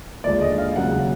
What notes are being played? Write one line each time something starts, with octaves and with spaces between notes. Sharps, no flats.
D#2 D3 F3 G#3 D5
D#5
F5
D#2 C#3 F#3 F#5